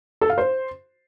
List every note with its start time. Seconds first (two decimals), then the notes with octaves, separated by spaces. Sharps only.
0.21 A4
0.30 F5
0.38 C5